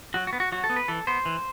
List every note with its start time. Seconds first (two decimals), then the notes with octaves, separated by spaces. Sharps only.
0.14 F#3 F#4
0.27 F#4
0.33 B3
0.40 F#4
0.52 F#3 F#4
0.64 A4
0.70 B3
0.76 B4
0.88 E3 A4
1.07 B3 C5
1.26 E3